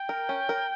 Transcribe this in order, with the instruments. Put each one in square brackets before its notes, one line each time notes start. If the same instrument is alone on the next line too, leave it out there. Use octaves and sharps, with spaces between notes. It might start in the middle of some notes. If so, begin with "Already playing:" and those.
Already playing: [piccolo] G5
[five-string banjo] A#4
C#4
A#4